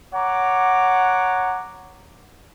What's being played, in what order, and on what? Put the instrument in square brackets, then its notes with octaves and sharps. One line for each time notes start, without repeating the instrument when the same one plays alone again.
[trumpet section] C#5 F#5 A#5 D6